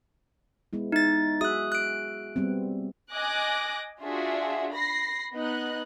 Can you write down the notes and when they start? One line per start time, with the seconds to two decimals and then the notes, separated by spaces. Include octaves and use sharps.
0.73 G#3 B3 E4
0.92 D#4 E5 A6
1.41 F#4 G#4 E5 D#6 F#6
1.72 F#6 D7
2.36 G3 B3 C4
3.13 D#5 G#5 D6 F#6 A#6
4.03 D4 F4 F#4 G#4 E5
4.72 B5 A#6 C7
5.34 B3 D#4 D#5 F#6